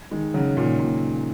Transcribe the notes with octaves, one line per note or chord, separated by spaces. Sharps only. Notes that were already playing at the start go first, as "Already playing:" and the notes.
D#3 G#3
C#3 F#3
A#2 D#3
A#2